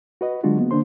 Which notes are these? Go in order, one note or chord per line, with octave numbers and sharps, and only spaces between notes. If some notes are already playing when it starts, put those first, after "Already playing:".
F#4 B4 D#5
D3 F#3 G#3 D4 F4 F#4
A#3 B3
D3 A#3 D4 C5 C6